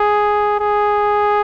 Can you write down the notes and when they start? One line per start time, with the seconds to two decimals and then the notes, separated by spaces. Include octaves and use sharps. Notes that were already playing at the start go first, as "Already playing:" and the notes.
Already playing: G#4
0.60 G#4